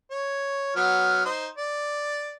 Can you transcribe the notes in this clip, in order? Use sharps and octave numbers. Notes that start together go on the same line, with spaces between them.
C#5
F#3 B3 F6
D#4 C5
D5